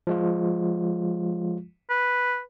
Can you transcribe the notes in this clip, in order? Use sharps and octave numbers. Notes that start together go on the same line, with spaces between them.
F3 G#3 F4
B4